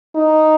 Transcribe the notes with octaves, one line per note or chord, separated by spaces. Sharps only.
D#4